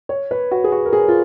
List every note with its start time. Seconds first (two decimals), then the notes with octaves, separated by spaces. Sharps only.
0.09 C#5
0.31 B4
0.51 F#4
0.64 G#4
0.72 F#4
0.85 A#4
0.93 G#4
1.08 F4